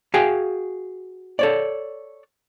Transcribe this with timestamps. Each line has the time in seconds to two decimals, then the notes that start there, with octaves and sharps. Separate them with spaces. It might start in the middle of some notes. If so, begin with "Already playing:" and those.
0.14 F#4 G#4 F5 G5 G#5
1.39 A4 C#5 D5